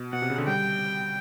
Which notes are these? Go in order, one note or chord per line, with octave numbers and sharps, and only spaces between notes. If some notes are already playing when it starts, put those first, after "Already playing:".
Already playing: B2
B2 F#5
C3
C#3
D3
G3 G5